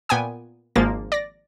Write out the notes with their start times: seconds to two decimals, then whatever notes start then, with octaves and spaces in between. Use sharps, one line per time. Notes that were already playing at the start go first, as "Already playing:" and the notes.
0.09 A#2 B3 G5 G#5 D#6
0.76 G#1 F3 G#3 A#3 A6
1.12 D5 A#6